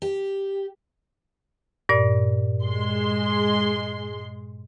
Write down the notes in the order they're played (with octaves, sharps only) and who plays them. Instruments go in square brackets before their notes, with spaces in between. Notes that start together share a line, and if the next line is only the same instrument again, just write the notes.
[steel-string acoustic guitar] G4
[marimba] G2 A#2 D5
[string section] G#3 C6